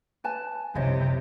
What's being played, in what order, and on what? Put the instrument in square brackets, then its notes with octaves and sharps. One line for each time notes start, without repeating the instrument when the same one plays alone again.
[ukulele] B4 G#5 A5
[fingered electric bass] F#1 C2 F2 [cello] C3 [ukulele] C5 C#5 D#5